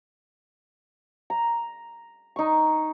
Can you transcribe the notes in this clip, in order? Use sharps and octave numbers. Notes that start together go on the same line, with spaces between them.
A#5
D#4 C#6